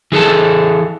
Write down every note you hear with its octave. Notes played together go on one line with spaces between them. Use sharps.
E3 G#4 A4 A5